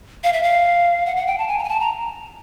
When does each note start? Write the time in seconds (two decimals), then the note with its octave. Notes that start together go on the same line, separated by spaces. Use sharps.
0.24 F5
0.33 E5
0.43 F5
1.06 F#5
1.16 F#5
1.27 G5
1.38 A5
1.48 G#5
1.59 A#5
1.64 G#5
1.69 A5
1.80 A#5